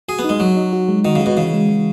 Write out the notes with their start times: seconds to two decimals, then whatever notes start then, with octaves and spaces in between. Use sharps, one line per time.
0.08 F#4 G#4
0.19 B3
0.24 D#4
0.29 G#3
0.40 F#3 F#4
0.57 D#4
0.73 F#4
0.89 G#3
1.05 D#3 F#4
1.15 C#3
1.21 F#4
1.26 B2
1.37 C#3 E3
1.53 G#3
1.69 E3